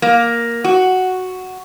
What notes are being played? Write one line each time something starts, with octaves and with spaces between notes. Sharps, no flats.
A#3
F#4